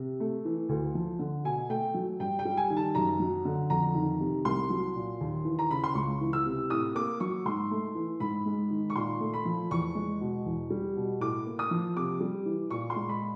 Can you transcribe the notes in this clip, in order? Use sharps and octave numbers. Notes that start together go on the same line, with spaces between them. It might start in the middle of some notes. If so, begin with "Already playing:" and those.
Already playing: C3
A3
E3
D2
F3
D3
B2 G#5
A3 G5
F#3
G2 G5
G5
G3
G#5
D#3
A5
F#2 A#5
F#3
D3
F2 A#5
D#3
C3
C2 C6
F#3
A#2
D#2
E3
A#5
C#3 B5
C6
C#2 C#6
E3
E6
C3
A2 D#6
A#3 D6
F#3 C#6
G#2 C6
A3
E3
G#2 B5
G#3
D#3
C#6
A#2 C6
A3
B5
F3
E2 C#6
G#3
B2
E2
G3
B2
A2 D6
A#3
D#6
F3
C3 D6
G3
E3
A#2 C#6
C6
G#3
B5